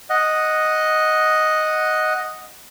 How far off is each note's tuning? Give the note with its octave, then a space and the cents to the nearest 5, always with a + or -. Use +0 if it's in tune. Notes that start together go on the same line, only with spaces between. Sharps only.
D#5 +0 F#5 -5